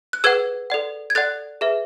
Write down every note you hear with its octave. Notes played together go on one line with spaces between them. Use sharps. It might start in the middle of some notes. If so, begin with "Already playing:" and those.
F#6
G#4 B4 F#5 E6 G#6
A4 D5 F#5
G#6
A4 D5 F#5 F#6 A6
G#4 B4 E5